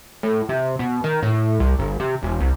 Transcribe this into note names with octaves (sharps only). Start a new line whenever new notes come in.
A2
C3
B2
D#3
A2
C2
G1
C3
E1
C2